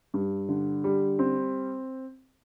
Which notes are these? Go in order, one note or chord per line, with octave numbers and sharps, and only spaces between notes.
G2
D3
G3
C4